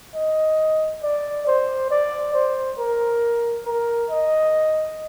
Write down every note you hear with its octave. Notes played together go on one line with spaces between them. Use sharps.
D#5
D5
C5
D5
C5
A#4
A#4
D#5